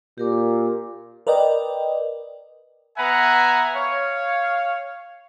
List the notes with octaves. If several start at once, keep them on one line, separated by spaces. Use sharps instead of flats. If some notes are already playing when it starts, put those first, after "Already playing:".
A#2 G4 A#4 D6
A#4 B4 D5 D#5 G5
B3 B4 E5 F#5 G#5 A#5
C#5 F5